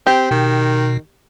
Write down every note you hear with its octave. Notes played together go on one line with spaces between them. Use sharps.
C4 G4
B2 D#3